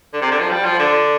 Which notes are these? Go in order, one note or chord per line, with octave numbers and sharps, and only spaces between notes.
D3
C3
D3
F3
G3
F3
D3